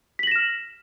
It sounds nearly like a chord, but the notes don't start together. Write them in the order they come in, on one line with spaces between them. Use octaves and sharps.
B6 F#7 A#6 E7 F6